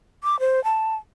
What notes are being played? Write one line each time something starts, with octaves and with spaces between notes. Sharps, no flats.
D6
C5
A5